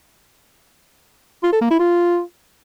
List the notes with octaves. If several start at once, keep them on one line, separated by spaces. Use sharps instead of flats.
F4
A4
A#3
E4
F4